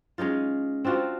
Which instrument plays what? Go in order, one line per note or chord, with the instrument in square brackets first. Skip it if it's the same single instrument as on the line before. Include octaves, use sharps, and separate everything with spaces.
[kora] G#3 C#4 D#4 F4
C4 D4 F4 F#4